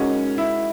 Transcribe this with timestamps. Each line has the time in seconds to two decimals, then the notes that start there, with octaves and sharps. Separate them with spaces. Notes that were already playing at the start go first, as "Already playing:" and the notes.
Already playing: G#3 C#4 D#4 F#4 A#4 D#5
0.38 E4